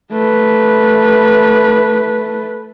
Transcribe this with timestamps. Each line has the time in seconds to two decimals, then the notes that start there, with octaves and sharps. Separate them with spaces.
0.12 A3 B4